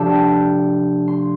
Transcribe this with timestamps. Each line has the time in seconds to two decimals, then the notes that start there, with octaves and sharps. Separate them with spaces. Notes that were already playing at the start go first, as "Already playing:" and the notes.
Already playing: C3 F3 A3 D4 G4 A4
0.10 G5
1.08 C6